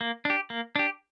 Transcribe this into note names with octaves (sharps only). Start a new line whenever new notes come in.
A#3
D4 G4
A#3
D4 G4